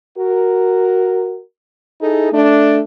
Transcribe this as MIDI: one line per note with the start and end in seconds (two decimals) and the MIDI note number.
0.18 1.40 66
0.18 1.40 70
2.01 2.29 63
2.01 2.29 64
2.01 2.29 68
2.01 2.29 69
2.32 2.80 57
2.32 2.80 62